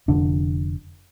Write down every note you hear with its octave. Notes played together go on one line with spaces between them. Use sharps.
F1 F2 D3 D4